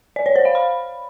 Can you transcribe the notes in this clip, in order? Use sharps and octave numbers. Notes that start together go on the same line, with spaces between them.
D5
C#5
C5
F5
B5